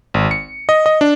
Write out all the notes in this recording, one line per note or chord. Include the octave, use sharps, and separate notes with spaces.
G#1
C#7
D#5
D#5
D4